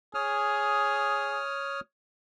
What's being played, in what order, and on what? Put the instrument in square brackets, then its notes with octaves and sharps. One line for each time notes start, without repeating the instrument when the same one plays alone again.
[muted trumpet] G#4 [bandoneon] C#5 D#6 F6